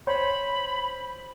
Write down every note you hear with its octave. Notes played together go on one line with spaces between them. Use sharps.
C5 C#5 B5